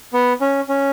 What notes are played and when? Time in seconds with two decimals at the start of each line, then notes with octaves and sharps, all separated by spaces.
0.13 B3
0.41 C#4
0.69 C#4